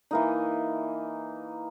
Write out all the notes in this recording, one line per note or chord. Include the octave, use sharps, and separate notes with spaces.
E3 A#3 D#4